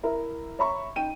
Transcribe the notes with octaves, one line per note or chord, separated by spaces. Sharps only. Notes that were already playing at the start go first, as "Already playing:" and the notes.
E4 A#4 E5 A#5
C#5 E5 A#5 B5 C#6
D#4 G5 D#7